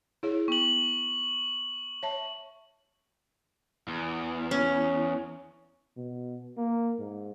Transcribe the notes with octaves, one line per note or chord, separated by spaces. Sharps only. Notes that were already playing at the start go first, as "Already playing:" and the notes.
E4 G#4 C#5
B3 C#6 F#7
C#5 E5 A5
E2
C#4
B2
A#3
G#2